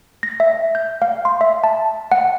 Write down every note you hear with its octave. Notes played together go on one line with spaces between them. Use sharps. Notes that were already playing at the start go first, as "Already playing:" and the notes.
A#6
E5
G6
F5
C6
E5
A5
F#5